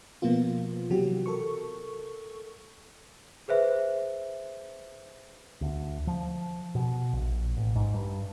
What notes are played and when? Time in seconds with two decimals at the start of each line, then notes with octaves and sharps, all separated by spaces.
0.22 B2 F3 A#3 B3 F4
0.90 C3 E3 F#3 F#4 G4
1.26 A4 A#4 C#6
3.48 G#4 B4 C5 E5
5.61 D2
6.07 F3
6.75 B2
7.13 A#1
7.57 A1
7.75 G#2
7.94 G2